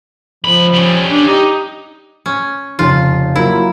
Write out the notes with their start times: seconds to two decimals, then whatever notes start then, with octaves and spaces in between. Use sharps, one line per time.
0.44 C#2 F3 B5
0.74 G3 C#4
1.10 D4
1.27 D#4 G4
2.26 C#4
2.79 F1 C#3 F4
3.36 F#3 A#3 E4 F4